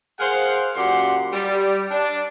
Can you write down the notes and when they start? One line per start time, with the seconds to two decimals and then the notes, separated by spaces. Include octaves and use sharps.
0.20 G#4 A#4 C5 F5 F#5
0.76 F#2 A#2 G4 F#5 C6
1.33 G3
1.91 D4